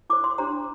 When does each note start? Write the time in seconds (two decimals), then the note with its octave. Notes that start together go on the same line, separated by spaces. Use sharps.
0.10 E4 A4 C5 D6
0.24 C6
0.38 D4 G4 C5 A#5